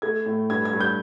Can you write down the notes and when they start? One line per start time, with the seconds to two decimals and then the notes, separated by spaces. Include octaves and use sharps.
0.02 A3 G#6
0.26 A2
0.50 G2 G#6
0.65 G#6
0.73 G2
0.80 G6